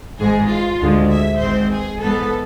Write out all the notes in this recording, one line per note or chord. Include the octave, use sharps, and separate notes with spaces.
G#1 G#2 E3 G#3 G#4
F4
D2 D3 G#3
E5
G#1 G#2 G#3 C4 C5
G#4
G#1 G#2 E3 B3 A4